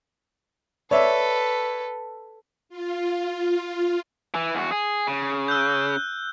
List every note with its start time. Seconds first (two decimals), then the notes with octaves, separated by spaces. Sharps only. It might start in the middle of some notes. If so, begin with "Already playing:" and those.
0.91 A4 B4 C#5 D5 E5
2.69 F4
4.35 E3
4.55 E2 F#4
4.72 G#4
5.07 C#3
5.48 E6 F#6 G6
5.89 F#6